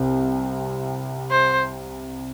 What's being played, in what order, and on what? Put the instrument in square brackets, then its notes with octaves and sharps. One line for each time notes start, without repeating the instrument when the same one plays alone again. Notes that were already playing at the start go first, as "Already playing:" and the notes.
Already playing: [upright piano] C2 C3 C4
[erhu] C5